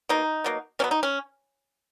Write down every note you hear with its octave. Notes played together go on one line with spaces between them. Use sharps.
B2 A#3 D#4
B2 F#3 A#3
B2 F#3 B3 C#4
D#4
C#4